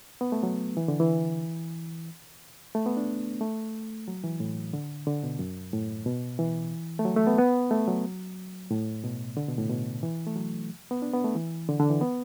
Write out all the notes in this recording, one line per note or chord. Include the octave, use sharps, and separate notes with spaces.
B3
A3
F#3
E3
D3
E3
A3
B3
D4
A3
F#3
E3
A2
D3
D3
B2
F#2
A2
B2
E3
A3
F#3
A3
B3
B3
A3
F#3
A2
B2
D3
B2
A2
B2
E3
A3
F#3
B3
D4
B3
A3
E3
D3
D3
E3
B3